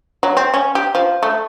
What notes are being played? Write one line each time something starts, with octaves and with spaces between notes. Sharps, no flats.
F#3
C4
C#4
G4
F3
A3